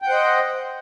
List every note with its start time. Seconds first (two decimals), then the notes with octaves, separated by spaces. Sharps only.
0.02 G5
0.06 F#5
0.09 C5
0.13 D#5